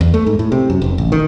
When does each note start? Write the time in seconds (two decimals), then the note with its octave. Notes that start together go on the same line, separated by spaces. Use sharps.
0.01 E2
0.14 A3
0.26 G#2
0.39 A2
0.52 C3
0.70 F#2
0.82 F1
0.98 A1
1.12 D#3